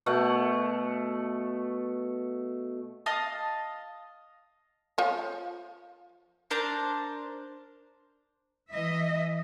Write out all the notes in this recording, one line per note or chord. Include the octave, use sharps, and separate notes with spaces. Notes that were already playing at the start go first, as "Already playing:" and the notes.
B2 A3 F#5
D#5 F5 A5 D#6
F3 F4 C#5
D4 A#4 C5 A5
E3 D#5 E5